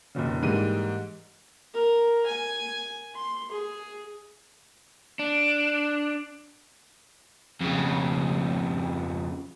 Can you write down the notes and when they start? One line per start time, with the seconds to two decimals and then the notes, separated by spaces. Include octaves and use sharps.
0.15 F1 D#2 A#2 C#3
0.42 G#2 E3 G3 G#3 A#3 D#7
1.74 A#4
2.26 G#5
3.15 C6
3.51 G#4
5.19 D4
7.61 F2 C#3